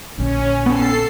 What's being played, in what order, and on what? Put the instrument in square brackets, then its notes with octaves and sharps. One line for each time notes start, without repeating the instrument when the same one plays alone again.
[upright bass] A#1 D3 [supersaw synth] C#4
[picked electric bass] B3 C#4 [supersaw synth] A4 C7